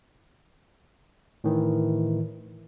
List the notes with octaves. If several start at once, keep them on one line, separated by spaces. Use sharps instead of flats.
A2 D#3 E3